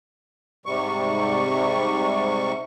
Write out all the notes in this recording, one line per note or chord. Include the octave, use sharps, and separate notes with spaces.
G#2 C3 G3 C#6